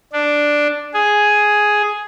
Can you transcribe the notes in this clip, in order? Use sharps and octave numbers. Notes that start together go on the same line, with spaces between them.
D4
G#4